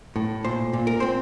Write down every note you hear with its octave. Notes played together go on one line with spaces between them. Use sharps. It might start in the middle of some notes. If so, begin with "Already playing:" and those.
A2
A#2 C5
A#2
A#4
C4 C5